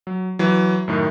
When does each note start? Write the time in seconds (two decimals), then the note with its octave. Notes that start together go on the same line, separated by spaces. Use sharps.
0.07 F#3
0.39 E3 F#3
0.88 F#2 A2 D#3